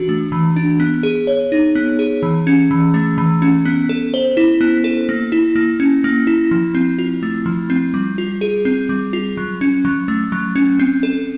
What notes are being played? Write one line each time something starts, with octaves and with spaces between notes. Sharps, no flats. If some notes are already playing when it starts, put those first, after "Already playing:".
Already playing: E3 D4 F#4
A3
E3
D4
B3
G#4
C#5
D#4
B3
G#4
E3
C#4
E3
A3
E3
C#4
B3
A4
C5
E4
B3
A4
A#3
E4
A#3
C#4
A#3
E4
F3
C4
F4
A3
F3
C4
G3
F4
G#4
C4
G3
F4
F#3
C#4
F#3
A3
F#3
C#4
C4
A4